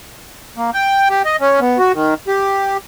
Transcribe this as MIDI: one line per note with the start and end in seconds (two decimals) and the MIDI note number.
0.57 0.70 58
0.74 1.08 79
1.10 1.22 67
1.25 1.36 75
1.40 1.60 61
1.60 1.78 59
1.78 1.92 66
1.93 2.14 51
2.28 2.77 67